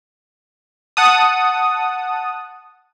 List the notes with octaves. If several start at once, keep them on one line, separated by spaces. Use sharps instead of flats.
F#5 A5 D#6